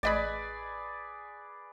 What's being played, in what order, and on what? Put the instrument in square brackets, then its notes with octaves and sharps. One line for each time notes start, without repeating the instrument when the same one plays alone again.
[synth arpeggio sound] A1 D#5 B5 [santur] G#4 B4 D5